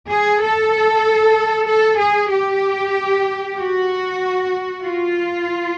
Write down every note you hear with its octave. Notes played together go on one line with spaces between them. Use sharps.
G#4
A4
A4
G#4
G4
F#4
F4